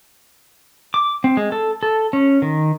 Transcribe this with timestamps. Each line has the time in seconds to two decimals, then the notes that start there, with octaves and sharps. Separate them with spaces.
0.94 D6
1.24 C4
1.37 G#3
1.52 A4
1.83 A4
2.13 C#4
2.42 D#3